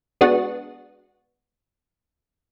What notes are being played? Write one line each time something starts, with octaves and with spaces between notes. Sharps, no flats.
G#3 B3 D4 F#4